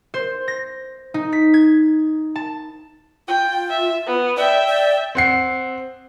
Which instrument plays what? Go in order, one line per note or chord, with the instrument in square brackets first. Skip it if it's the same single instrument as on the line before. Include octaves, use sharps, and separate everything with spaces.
[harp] C5
A#6
D#4
B6
G#6
A5
[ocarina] F4 [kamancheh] G5
[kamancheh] E5
B3
[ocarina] D5 [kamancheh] E5 G5
[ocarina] D5
[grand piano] C4 F#5 C7